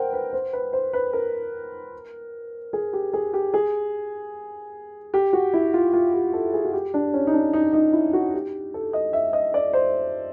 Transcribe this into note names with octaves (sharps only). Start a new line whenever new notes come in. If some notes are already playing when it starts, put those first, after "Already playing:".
Already playing: A#4 C5 F#5 G5
B4
C5
B4
C5
B4
A#4
G#4
G4
G#4
G4
G#4
G4
F#4
E4
F4
F4
G4
A4
G#4
F#4
G4
D4
C#4
D#4
D4
D#4
D#4
E4
F#4
G4
A4
D#5
E5
D#5
D5
C5